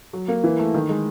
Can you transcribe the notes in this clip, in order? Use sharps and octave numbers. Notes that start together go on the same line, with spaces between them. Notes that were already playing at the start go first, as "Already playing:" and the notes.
F#3
A#3
E3
A3
D#3
G#3